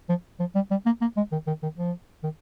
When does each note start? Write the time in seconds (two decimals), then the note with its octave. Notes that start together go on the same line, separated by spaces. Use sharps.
0.09 F3
0.40 F3
0.55 G3
0.71 G3
0.86 A#3
1.01 A#3
1.17 G#3
1.32 D#3
1.47 D#3
1.63 D#3
1.78 F3
2.24 D#3